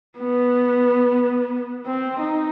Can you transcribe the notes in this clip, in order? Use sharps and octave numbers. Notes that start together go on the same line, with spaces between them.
B3
C4
D#4